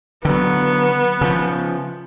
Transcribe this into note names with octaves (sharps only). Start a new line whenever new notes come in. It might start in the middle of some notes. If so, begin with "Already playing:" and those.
D3 F#3 B3
C#3 F3